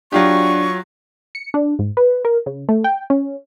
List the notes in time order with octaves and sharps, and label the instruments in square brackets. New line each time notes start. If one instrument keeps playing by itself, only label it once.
[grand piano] F#3 F4 G4 [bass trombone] D4 [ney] C#6
[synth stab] C#7
D4
G#2
B4
A#4
C#3
A3
G5
C#4